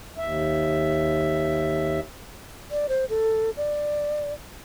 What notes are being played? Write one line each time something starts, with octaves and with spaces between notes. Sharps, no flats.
D#2 E5
D5
C5
A4
D5